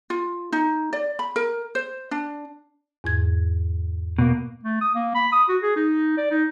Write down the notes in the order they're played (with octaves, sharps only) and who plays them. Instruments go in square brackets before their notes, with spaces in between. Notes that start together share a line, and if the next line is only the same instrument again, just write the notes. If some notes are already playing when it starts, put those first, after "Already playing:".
[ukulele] F4
D#4
D5
B5
A#4
C5
D4
[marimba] E2 G#2 G#6
[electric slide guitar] B2 A#3
[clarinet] A3
D#6
A#3
B5
D#6
F#4
G#4
D#4
D5
D#4